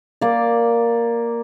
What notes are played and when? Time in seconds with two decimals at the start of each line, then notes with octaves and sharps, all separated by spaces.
0.21 A#3 D5